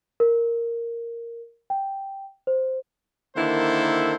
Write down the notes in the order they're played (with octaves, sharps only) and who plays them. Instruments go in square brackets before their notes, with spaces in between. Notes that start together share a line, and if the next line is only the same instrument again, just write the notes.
[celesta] A#4
G5
C5
[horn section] D3 D#3 A#3 E4 A4 C5